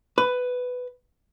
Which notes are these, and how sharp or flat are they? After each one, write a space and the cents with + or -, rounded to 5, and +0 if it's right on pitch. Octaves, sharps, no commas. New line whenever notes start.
B4 +10